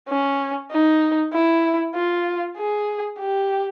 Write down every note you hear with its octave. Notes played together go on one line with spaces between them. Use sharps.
C#4
D#4
E4
F4
G#4
G4